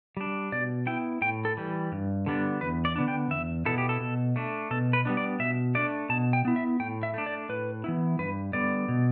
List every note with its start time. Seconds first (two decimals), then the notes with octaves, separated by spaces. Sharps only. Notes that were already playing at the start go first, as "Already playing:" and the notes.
0.17 G3 D4
0.52 B2 D5
0.86 B3 E4 G5
1.22 A2 G5
1.45 A4
1.57 E3 G3
1.92 G2
2.26 D3 G3 B3 D4
2.61 E2 B4
2.85 D5
2.96 D3 B3 D4
3.08 G5
3.30 E2 E5
3.65 B2 B3 E4 A4
3.78 G4
3.89 A4
4.01 B2
4.36 A3 D4
4.71 B2 A4
4.93 B4
5.05 G3 B3 D4
5.17 D5
5.39 B2 E5
5.75 A3 D4 D5
6.09 B2 A5
6.33 G5
6.45 B3 E4
6.56 E5
6.80 A2 G5
7.03 E5
7.14 A3 D4
7.26 D5
7.49 A2 B4
7.84 E3 B3 E4
8.19 G2 B4
8.53 D3 G3 B3 D5
8.88 B2